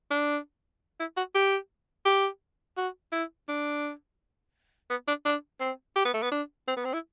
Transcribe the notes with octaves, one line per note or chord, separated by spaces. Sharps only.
D4
E4
F#4
G4
G4
F#4
E4
D4
B3
D4
D4
C4
G4
B3
A3
B3
D4
C4
B3
C4
E4